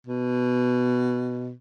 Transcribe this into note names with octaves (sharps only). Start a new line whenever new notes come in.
B2